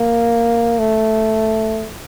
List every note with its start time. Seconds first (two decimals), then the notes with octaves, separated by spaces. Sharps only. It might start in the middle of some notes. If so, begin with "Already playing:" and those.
Already playing: A#3
0.79 A3